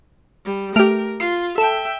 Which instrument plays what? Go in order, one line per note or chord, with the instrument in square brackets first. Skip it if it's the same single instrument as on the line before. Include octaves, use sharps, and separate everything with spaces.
[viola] G3
[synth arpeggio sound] A3 G4 [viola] A#4 [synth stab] F6 D7
[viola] F4 [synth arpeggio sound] C7
[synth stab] A4 [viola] E5 G5